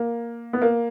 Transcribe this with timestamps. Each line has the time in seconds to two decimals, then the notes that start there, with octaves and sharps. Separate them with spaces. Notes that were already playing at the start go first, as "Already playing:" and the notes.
Already playing: A#3
0.53 B3
0.62 A#3